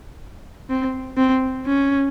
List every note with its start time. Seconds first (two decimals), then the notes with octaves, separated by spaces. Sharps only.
0.70 C4
1.17 C4
1.66 C#4